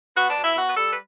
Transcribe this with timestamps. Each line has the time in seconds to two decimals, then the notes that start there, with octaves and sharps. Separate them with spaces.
0.16 B3 F#4
0.29 D4
0.37 B2
0.43 E4
0.56 B2 F#4
0.69 B4
0.76 G3 A4
0.91 B4